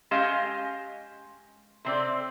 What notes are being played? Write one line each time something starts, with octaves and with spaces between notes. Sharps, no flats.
G#3 C#4 G4 D#5 F5 G#5
C3 C4 D5